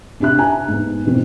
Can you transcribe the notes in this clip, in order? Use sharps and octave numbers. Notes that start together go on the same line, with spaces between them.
C3 D4 G4 E5 F#6
G#5 A#5
G#2 B3
B2 E3 C4